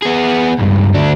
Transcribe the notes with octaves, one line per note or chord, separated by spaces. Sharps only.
B3 G#4
C#2 G2
D2 D4